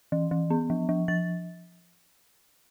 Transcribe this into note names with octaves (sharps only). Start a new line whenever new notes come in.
E3
E3
B3
F3
F3
F3 A6